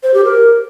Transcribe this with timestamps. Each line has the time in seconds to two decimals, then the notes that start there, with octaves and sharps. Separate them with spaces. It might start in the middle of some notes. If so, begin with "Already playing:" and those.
0.03 C5
0.14 G4
0.25 A#4